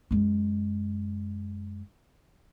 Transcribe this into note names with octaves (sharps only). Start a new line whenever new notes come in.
F#2 G#3